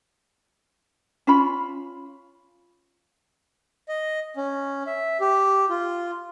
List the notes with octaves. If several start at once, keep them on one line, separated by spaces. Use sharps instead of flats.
C#4 F4 B5
D#5
C#4
E5
G4
F4